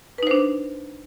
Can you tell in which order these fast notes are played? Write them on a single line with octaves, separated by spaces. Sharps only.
B4 D#4 C5 D4